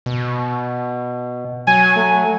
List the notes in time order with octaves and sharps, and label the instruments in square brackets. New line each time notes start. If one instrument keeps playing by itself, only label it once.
[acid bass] B2
[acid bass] F#3 [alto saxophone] G#5
[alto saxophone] A3